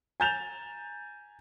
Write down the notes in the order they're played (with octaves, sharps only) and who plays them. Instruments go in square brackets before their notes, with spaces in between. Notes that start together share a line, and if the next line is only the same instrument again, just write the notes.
[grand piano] G#5 A#5 G6 A6 E7 F7